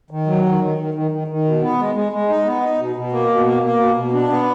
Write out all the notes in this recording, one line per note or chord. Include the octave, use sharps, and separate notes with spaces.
D#3
F#3
D#3
D#3
D#3
D#3
D#3
D#3
B2
B3
G#3
G#3
G#3
D#4
B3
D#4
B2
B2
A#3
B2
A#3
A#3
B2
B2
D4
B3